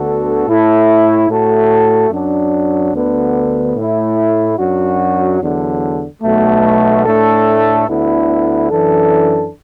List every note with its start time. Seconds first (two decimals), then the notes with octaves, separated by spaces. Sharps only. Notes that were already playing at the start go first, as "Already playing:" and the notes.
Already playing: D2 D3 B3 F#4 A4
0.46 A2 A3 E4 A4
1.29 A2 A3 F#4 A4
2.10 F#2 F#3 D4
2.93 D2 D3 B3
3.75 A2 A3 E4
4.57 F#2 F#3 D4 F#4
5.39 E2 D3 F#3 D4
6.22 B1 B2 A3
7.04 A2 A3 D4 A4
7.87 D2 D3 B3 E4
8.69 F#2 E3 D4 A4